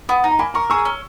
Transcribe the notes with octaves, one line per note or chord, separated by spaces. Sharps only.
B3 B5 D#6
D#4
A#5
A#3 G#5 B5
A#4 A#5 C#6
G#4 C#6 E6
C#4